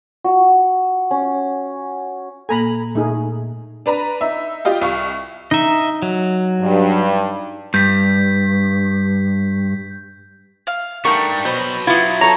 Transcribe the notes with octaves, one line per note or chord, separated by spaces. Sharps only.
F#4
C#4
A#2 A#3 A4 G#5 A#5 B5
A#2 A3 D#4 G#4
D4 B4 A#5
D#4 E5
F4 G4 D#5 F5
C2 F5 C#6
D#4 D#5 E5
F#3
G2
G2 G6 B6
F5
G3 A3 D4 D#4 A#4 F#5 C#6
B2 F#3 B4 C5
B3 E4 F4
A4 C#5 A#5